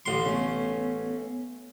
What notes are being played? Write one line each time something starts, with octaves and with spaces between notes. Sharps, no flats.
A1 D3 C6
A3 B3 C#4